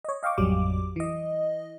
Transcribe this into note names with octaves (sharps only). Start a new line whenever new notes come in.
C#5 D#5
D#5 F5 G5 C#6 D6
A1 F2 F#3 G3 D6
E3 D#5